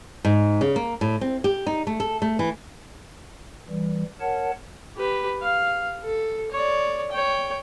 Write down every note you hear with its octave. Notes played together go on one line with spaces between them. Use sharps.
G#2
C#3
A#3
A2
C4
G4
D#4
A3
A4
A3
E3
E3 G3
A#4 C#5 F#5 A5
G4 B4
F5
A4
C#5 D5
C#5 G5